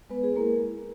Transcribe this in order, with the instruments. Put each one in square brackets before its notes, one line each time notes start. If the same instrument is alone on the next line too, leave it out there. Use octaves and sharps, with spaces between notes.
[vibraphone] G#3 B3 B4
G#4
A#3 E4 A#4